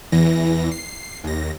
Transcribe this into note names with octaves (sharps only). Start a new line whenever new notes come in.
E2 E3 A#6
C7
D#2 A#6